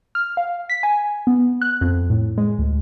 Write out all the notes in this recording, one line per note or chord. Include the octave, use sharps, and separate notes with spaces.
F6
F5
B6
G#5
B3
F#6
F2
A2
G#3
D2